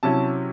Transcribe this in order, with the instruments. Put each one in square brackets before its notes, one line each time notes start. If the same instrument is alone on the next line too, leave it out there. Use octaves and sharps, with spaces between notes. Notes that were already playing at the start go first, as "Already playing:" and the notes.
[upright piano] C3 F#3 C#4 E4 A5